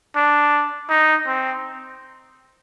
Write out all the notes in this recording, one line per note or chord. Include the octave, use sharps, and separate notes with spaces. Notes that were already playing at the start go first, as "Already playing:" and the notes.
D4
D#4
C4